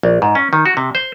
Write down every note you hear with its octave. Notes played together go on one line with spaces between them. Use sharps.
A#1
G#2
C#4
D#3
F#4
C3
C5